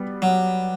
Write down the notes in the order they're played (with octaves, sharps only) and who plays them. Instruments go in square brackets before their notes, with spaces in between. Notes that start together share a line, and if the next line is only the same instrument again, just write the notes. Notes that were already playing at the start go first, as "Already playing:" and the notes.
Already playing: [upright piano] G3 B3
[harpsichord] F#3